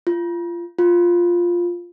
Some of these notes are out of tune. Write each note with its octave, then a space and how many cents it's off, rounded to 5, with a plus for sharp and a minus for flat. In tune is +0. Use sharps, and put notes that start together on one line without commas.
F4 -25
F4 +0